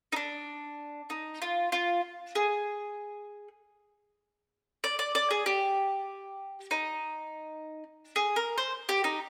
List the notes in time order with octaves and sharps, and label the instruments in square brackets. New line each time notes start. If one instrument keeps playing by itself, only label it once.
[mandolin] D#4
D4
D#4
F4
F4
G#4
D5
D5
D5
G#4
G4
D#4
G#4
A#4
C5
G4
D#4